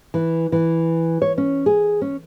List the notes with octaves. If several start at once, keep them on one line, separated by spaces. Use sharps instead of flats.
E3
E3
C#5
C#4
G#4
C#4